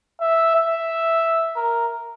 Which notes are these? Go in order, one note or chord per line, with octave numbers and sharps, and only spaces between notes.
E5
E5
A#4